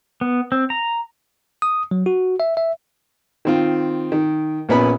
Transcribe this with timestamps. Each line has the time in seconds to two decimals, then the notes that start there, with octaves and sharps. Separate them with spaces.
0.21 B3
0.52 C4
0.70 A#5
1.62 D#6
1.91 F#3
2.06 F#4
2.40 E5
2.57 E5
3.45 D#3 C4 F4
4.12 D#3
4.69 A#1 A#2 B3 C#4 B4 B5